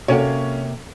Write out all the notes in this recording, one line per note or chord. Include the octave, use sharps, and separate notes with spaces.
C3 A#3 C#4 F#4 A4 C#5 F#5